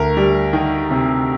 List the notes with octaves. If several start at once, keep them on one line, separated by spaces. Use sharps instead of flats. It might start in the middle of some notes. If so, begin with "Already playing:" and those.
Already playing: D2 A#4
G3
D#3
C3